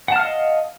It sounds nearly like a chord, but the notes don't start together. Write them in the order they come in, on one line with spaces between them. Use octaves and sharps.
F#5 A5 F6 F5 D#5